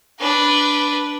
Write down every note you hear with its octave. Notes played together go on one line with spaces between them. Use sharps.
D4 B4